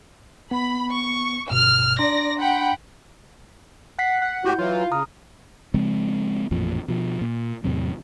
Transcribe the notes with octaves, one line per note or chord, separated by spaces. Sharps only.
B3 B5
C#6
G1 G2 B2 F6
D4 D5 A#5 C6 A#6
F#5 G5 B5
F#5 F#6 B6 C7
F#5
A2 E4 F#4 G4 G6
E3 F#3 F4
C#3 A#5 D#6 F6
C#3 F3 G#3 C4
A1 F2 A#2 F3
B2 F3
A#2
E2 A2 C3 F#3